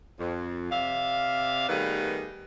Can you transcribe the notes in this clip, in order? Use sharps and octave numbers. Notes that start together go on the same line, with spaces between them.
F2
C3 D5 E5 F5
D#3 G3 A3 B3 G#4 B4